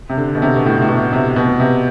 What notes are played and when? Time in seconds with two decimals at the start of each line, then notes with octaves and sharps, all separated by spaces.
0.09 C3
0.17 D3
0.35 B2
0.42 C3
0.56 B2
0.65 A2
0.81 A2
0.89 B2
1.13 C3
1.36 B2
1.60 C3